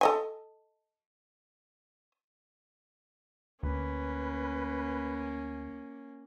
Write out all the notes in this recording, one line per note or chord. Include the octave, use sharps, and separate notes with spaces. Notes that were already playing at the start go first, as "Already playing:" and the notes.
A4 D#5 G#5
D2 A#3 C#4 B4